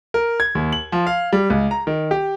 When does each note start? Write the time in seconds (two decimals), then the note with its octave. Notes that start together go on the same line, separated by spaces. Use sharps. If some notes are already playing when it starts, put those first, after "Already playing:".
0.14 A#4
0.40 G#6
0.55 D#2
0.73 F#7
0.92 F3
1.07 F5
1.33 G3
1.50 C#2
1.71 A#5
1.87 D#3
2.11 G4